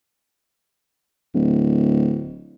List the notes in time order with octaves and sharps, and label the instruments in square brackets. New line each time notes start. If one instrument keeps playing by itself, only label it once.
[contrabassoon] D1